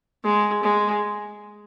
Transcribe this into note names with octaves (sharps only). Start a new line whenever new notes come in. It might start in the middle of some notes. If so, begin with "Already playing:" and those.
G#3
G#3